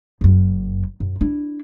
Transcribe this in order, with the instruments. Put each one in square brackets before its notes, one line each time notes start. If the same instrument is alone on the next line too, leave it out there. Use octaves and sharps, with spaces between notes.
[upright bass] F#1 F#2
F#2
D4 E4